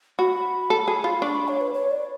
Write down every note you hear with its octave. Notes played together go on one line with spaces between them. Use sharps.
F#4 B5
A4
G#4
F4
D4 C#6
B5
C#5
B4
C#5
D5